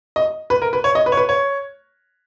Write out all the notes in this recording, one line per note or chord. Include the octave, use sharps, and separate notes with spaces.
D#5
B4
A#4
B4
C#5
D#5
B4
C#5
B4
C#5